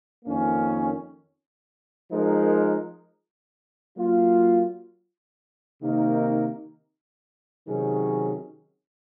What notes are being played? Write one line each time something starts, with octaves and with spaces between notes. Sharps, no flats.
F2 D#3 A#3 C#4
F3 G#3 D#4 A#4
F#3 A#3 F4
C3 D#3 A#3 D#4 A#4
C3 D#3 F#3 C#4 G#4